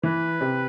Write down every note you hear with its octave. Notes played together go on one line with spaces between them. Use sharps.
E3 B4
C3